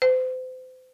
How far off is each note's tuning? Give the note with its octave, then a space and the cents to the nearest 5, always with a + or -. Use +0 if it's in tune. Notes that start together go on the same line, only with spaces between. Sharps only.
C5 -35